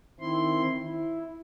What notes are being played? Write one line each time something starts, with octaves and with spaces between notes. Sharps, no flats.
D#3 C4 E4 C6
E4